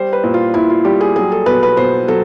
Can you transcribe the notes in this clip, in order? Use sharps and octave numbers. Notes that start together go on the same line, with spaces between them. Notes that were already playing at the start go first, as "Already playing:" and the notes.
Already playing: G3 C5
B4
A#2
F4
A#2 E4
F4
G3 G4
G#4
F#3 G#4
A4
B2 B4
B4
B2 C5
F#3 A4